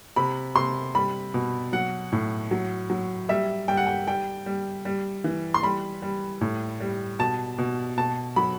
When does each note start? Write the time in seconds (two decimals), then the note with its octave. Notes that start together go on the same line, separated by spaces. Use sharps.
0.16 C3 B5
0.56 C3 C6
0.95 G3 B5
1.34 B2
1.73 F#3 F#5
2.12 A2
2.51 F#3
2.90 F#3
3.29 G3 E5
3.68 G3 G5
3.77 F#5
3.87 G5
4.07 G3 G5
4.46 G3
4.85 G3
5.24 E3
5.54 C6
5.63 G3 B5
6.02 G3
6.41 A2
6.80 G3
7.19 B2 A5
7.58 B2
7.97 B2 A5
8.36 F#3 B5